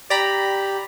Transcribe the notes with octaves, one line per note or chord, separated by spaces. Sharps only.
G4 D5 A#5 B5